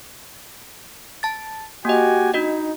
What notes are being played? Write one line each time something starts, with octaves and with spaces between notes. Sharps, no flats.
A5 A6
A#3 F#4 G4 D#5 G#5
D4 D#4 F#4 D#5